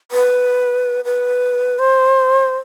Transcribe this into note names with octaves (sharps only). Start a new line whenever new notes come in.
B4
B4
C5